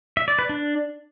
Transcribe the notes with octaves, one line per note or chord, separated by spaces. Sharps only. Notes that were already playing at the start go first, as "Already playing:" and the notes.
E5
D5
B4
D4